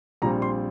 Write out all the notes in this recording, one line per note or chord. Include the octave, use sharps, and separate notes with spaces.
A#1 A#2 G3 C4 A#5
C6